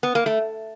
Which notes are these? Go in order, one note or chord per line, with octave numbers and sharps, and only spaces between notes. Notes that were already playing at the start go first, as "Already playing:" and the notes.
B3
A#3
A3